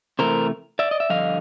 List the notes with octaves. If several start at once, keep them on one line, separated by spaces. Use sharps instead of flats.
C3 E3 A3 A#4 C5
D5 E5
D#5
E5
G2 D3 F3 D#5 F5